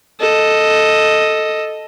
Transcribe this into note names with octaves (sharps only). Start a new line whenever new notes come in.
A4 D#5